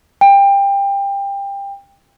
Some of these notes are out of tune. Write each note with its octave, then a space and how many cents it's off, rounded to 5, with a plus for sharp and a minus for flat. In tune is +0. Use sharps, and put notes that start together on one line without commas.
G5 +25